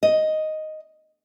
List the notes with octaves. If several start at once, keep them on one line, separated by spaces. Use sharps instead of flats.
D#5